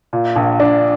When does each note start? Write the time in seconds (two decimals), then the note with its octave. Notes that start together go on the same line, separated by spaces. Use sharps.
0.13 A#2
0.36 A#1
0.60 D4